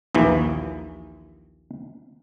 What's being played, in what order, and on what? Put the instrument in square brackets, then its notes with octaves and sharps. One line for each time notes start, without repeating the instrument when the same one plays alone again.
[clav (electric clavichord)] A#1 D#2 E3